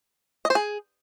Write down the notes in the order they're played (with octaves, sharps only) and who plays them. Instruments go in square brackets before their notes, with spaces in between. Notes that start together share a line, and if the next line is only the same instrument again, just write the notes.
[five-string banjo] D#5
C5
G#4